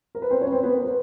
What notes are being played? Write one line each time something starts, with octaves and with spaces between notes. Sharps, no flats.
A#4
B4
C4 C5
C#4 C#5
B4
C4 C5
B3 B4
A#4
B4